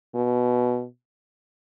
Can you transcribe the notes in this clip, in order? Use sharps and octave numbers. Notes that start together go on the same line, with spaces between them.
B2